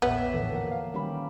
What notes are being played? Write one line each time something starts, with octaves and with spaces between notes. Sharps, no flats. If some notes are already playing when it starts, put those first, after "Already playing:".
A#1 E2 A#2 B3 G4 C#5 E5
A2 D3 E3 F3 A4
A#3 A#4 F#5
F5
D#3 G3 A#3 C#4 G4 B5